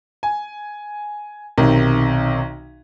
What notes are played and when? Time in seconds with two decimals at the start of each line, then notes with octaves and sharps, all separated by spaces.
0.23 G#5
1.58 B1 C3 D#3